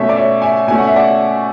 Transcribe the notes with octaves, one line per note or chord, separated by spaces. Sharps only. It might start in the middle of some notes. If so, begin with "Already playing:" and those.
Already playing: B2 A3 C#4 C#5 E5
D5
C#5 E5
E5 G#5
B2 A3 C#4 G#5
F#5
E5
D5 F#5